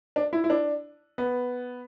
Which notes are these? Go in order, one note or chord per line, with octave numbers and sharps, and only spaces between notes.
D4
E4
E4
D4
B3